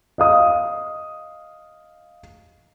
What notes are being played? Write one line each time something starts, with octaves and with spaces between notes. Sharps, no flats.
D#5 F5 D#6